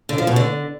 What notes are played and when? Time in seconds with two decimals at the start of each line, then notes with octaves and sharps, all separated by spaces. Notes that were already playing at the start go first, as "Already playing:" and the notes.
0.09 D3
0.18 F3
0.27 B2
0.36 D3